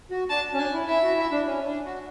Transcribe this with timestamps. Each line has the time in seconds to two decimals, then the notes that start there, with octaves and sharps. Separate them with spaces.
0.11 F#4
0.30 D4 A5
0.54 C#4
0.59 D4 G#5
0.73 E4
0.87 E4 E5
1.03 F#4
1.17 E4
1.32 D4
1.46 C#4
1.65 D4
1.85 F#4